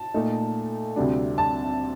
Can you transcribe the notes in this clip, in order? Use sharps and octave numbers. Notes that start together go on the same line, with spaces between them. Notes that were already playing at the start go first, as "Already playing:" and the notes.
Already playing: A5
A#2 A3 D#4
D2 C3 G3 D4
A5